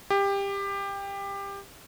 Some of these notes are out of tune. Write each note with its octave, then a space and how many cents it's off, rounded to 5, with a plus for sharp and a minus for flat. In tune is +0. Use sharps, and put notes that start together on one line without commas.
G4 +20